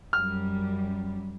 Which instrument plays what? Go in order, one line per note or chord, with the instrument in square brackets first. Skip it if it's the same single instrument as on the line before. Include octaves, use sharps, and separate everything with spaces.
[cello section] F#2 G3 [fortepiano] F6